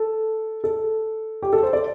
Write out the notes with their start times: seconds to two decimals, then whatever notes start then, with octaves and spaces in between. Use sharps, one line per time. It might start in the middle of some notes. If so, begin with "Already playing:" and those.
Already playing: A4
0.64 A4
1.43 G4
1.53 A4
1.63 C5
1.73 D5